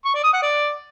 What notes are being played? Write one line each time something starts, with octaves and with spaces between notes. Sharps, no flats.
C#6
D5
D#6
F#5
D5